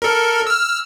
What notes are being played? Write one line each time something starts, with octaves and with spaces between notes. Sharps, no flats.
A4 A#4
E6 F6